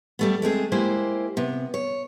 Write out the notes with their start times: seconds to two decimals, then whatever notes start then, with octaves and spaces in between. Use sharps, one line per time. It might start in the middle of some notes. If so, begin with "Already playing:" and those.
0.19 G3 A3 B3
0.42 G#3 A3 C4 G#4
0.72 G#3 A#3 E4 G4 C5
1.37 C3 B3
1.74 C#5